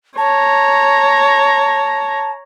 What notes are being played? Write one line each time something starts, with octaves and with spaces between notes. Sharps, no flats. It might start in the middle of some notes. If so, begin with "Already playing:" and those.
C#5 A5 A#5